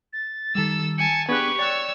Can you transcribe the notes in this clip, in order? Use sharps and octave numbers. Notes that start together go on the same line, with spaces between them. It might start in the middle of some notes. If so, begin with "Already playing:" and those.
A6
D#3 G3 A4 E6
G#5 A5 C#7
B3 D4 G4 G#4 B4 C#6 F#6 G#6
C#5 D5 G5 E6 F#6 A6